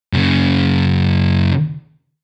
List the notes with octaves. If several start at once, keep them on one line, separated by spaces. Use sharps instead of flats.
F#2 C#3